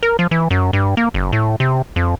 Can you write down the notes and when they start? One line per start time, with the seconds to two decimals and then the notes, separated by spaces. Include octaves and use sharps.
0.03 A#4
0.19 F3
0.31 E3
0.51 F#2
0.73 G2
0.97 A#3
1.14 F#1
1.32 A2
1.60 C3
1.96 F2